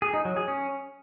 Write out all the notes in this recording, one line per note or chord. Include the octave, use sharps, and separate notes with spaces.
G#4
D#4
F#3
G#4
C#4